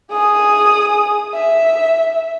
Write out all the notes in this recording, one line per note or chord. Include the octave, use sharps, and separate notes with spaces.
G#4 D#6
E5